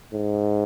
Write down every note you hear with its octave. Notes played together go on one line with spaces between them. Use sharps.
G#2